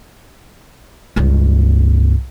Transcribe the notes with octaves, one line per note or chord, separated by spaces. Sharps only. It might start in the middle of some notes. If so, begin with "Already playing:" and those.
C#2 G2